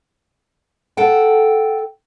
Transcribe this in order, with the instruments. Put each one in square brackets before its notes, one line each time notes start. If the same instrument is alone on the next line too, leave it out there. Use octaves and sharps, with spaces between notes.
[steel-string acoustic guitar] A4 F#5 G5